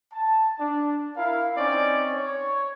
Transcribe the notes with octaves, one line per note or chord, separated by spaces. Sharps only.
A5
D4
E4 A#4 F5
C4 C#4 D#4 D5
C#5